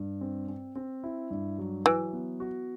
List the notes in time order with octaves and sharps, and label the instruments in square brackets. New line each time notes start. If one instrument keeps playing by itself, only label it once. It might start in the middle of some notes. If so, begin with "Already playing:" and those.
Already playing: [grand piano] G2
C4
C4
C4
E4
G2
F#3
[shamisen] E3 [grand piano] F#3
[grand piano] B3
F#4